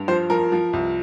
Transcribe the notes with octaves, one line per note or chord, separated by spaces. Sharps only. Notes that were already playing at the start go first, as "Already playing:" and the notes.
Already playing: G2
F3 C5
F3 A#4
F3
C2